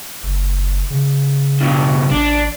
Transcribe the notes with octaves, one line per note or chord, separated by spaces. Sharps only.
F#1
C#3
G2 B2
A1 D4